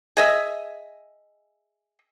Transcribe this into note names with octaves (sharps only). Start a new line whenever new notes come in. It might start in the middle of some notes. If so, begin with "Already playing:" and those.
G#4 D#5 E5